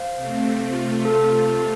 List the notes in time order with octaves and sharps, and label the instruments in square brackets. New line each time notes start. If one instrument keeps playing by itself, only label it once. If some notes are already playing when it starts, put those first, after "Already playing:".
Already playing: [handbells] C5 F5
[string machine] C3 A3 C4
C3 A3 F4
[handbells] A4